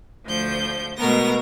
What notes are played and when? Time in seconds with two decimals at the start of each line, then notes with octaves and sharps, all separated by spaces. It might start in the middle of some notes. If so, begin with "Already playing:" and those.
0.25 D2 F3 G6
0.98 B2 G#3 A3 B3 A#4 A#6